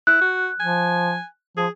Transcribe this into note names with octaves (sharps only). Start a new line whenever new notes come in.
E4 F#6
F#4
F3 G#5
F3 G#4